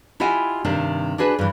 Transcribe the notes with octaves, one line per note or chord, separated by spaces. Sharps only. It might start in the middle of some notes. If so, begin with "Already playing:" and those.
E4 F4 G4 D#5 F#5 G#5
G2 C3 D#3 D4
D4 F#4 G#4 B4
G2 E3